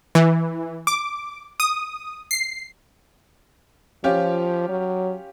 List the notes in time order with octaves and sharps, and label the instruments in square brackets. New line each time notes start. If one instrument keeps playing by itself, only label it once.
[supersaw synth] E3
D6
D#6
C7
[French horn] F3 [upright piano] C#4 F4 G4
[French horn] F#3